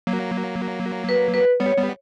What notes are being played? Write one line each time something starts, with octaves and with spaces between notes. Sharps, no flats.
F#3 A#3
B4
B4
G3 B3 C#5
G3 B3